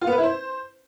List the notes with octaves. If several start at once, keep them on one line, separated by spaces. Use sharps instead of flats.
F4
B3
B4
E4
C5